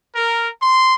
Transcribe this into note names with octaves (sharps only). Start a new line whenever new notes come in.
A#4
C6